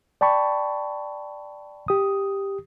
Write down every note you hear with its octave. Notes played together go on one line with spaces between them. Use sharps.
D5 G5 A5 B5 C#6
G4 D#6